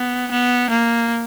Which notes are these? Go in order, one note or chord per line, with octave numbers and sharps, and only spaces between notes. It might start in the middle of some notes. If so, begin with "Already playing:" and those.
Already playing: B3
B3
A#3